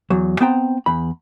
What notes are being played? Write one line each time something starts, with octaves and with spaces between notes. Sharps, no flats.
E2 F#3
B3 C4 C5 G5 A#5
E2 B5